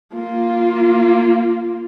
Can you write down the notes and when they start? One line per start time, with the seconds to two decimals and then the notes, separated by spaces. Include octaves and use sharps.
0.14 A#3 F4